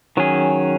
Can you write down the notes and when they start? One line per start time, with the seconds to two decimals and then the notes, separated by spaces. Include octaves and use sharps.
0.17 D#3 F#3 C#4 G#4